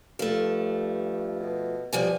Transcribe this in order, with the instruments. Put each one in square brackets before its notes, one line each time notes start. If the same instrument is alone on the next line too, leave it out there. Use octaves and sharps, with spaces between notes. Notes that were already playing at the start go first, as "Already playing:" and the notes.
[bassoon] G2 [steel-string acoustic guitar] F3 A3
[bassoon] B2
[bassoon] B2 [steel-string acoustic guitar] F3 G3 G#5